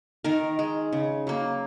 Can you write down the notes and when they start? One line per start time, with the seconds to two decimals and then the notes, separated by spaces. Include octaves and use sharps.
0.24 D#3 A#4
0.59 G#3
0.93 C#3
1.27 F#3 A#3